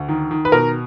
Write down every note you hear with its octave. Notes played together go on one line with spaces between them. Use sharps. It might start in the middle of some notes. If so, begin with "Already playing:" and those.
Already playing: D2
D#3
D#3
B4
B2 A#4